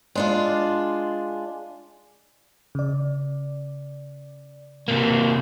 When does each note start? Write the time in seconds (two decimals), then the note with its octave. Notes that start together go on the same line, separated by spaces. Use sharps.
0.15 G#3 D4 F4
2.75 C#3 D5
4.88 C3 A#3